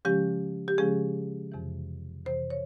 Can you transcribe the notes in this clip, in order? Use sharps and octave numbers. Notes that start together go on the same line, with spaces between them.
C#3 F3 G#3 C#4 G4
G4
C#3 F3 G#3 C#4 G#4
F2 C3 E3
F2 C3 E3 C5
C#5